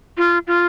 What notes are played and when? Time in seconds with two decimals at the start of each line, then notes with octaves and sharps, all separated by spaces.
0.17 F4
0.47 F4